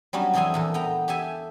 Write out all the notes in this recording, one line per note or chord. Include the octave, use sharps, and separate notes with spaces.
F#3 G3 B3 C#4 D4
F2 E3 C4 G#4 A4 G#5
E2 A#2 A4
B3 G5 A#5
G4 A4 E5 G#5